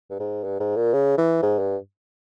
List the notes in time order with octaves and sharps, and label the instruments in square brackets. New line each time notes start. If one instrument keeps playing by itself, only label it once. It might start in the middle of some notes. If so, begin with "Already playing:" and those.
[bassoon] G2
G#2
G2
G#2
A#2
C#3
E3
G#2
G2